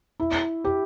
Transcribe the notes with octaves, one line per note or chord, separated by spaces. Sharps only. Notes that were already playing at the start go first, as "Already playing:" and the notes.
E4
G4